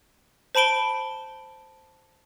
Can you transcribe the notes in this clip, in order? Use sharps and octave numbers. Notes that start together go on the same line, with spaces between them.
C5 A5 B5 D7 G7